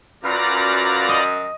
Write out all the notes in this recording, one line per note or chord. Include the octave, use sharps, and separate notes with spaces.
F#2 F4 B4 D5 F5 A#5
D#5